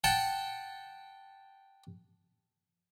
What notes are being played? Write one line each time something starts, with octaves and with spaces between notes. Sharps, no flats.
F#5 G5 A5